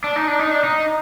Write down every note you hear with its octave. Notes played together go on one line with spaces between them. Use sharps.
D4
D#4
D4
D#4
D4
D#4